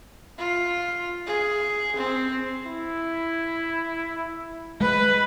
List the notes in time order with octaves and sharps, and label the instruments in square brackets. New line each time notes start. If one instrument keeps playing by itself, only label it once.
[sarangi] F4
G#4
C4
[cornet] E4
[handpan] G#3 [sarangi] B4